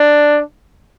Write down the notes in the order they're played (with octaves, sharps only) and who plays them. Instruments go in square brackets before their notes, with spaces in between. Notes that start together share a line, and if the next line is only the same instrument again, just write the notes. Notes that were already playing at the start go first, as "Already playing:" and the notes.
Already playing: [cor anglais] D4